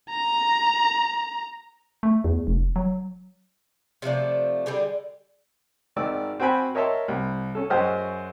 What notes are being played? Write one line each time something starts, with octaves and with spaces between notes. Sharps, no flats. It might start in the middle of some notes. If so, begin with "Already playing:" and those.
A#5
A3
E2
F1
F#3
C3 F3 A3 D5
D3 G3 G4 G#4
G#1 D#3 D5 E6
C4 F#4 C5 G5 G#5 B5
A#4 C#5 D#5 E5 A5 C6
C2
C#4 A4
F#2 F#4 G#4 C5 D#5 F6